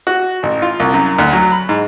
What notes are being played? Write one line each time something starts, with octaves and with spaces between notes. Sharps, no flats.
F#4
A1
F4
C2
F#2
D2
F#3
B5
G#2